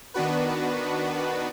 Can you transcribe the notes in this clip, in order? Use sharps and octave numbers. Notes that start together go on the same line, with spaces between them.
D#3 B3 D4 F#4 B4